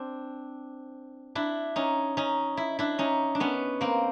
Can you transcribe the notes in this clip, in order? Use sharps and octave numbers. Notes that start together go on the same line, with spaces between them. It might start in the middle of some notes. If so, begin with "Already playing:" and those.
Already playing: C4 D4
D4 E4
C#4 D#4
C#4 D#4
E4
D4 E4
C#4 D#4
D4
B3 C#4
A#3 C4